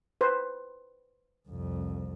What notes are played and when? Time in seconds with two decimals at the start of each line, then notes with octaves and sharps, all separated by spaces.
0.21 B4 C5
1.48 C2 F2